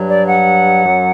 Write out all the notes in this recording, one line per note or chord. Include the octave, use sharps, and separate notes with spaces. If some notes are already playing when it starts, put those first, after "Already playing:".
Already playing: G2 F#3
D5
F#5
F#2 F#3